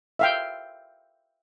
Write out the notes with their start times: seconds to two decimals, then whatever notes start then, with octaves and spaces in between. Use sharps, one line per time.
0.19 E5 F5 G5